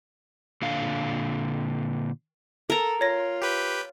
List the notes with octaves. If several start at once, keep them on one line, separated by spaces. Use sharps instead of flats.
A#2 D3 F5
A4 A#4 A#5
F4 C#5 A#6
G4 B4 G5